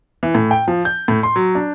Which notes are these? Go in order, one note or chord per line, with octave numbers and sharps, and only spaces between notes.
E3
A2
G5
F3
G6
A2
C6
F#3
D4